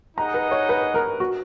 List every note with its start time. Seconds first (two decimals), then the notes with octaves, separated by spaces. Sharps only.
0.18 D#4 G#4 D#5 F#5 A#5
0.34 B4
0.51 C#5
0.69 B4
0.94 A#4
1.20 F#4